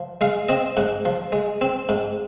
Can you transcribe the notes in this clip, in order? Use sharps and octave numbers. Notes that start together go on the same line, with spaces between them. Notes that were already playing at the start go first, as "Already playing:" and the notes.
Already playing: F3
G#3 F5
C4 D#5
G#2 F#5
F3
G#3
C4
G#2